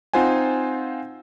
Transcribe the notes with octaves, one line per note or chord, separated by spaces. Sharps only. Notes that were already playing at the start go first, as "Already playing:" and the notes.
C4 D#4 F4 C5 F#5 G#5